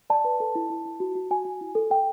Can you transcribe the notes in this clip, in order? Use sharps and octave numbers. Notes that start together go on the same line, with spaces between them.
D5 A5
B4
A4
E4
E4
E4
F#4
F#4
F#4 G#5
F#4
E4
A4
A4 G5